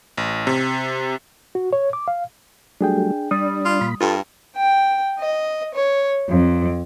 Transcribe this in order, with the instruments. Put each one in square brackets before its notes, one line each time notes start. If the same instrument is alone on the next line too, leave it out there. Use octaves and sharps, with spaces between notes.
[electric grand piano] A1
C3
[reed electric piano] F#4
C#5
D6
F5
[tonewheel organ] F#3 G3 A3 [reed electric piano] D4 G#4 G5
[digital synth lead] G3 [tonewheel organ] D4 [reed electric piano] D#6
[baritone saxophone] F4
[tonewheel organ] A#2 B5
[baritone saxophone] G2 [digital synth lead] F4 [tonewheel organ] A4
[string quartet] G5
D#5
C#5
F2